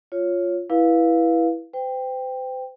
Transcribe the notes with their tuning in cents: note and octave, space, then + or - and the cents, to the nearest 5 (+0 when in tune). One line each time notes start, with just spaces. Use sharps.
F4 +0 C#5 +0
E4 +0 B4 -20 F5 +0
C5 -40 G5 +10